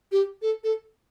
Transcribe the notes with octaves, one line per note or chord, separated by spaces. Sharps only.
G4
A4
A4